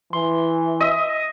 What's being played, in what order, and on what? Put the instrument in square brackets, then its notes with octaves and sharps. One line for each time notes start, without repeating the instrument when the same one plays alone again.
[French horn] E3 [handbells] C6
[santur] D#5 E5